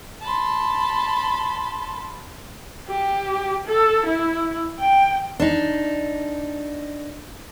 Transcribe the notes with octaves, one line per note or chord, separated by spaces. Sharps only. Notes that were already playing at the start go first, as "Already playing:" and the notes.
A5 B5 C6
G4
A4
E4
G5
D4 D#4